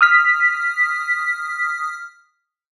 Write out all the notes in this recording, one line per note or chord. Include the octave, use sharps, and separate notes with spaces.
D#6 F6 B6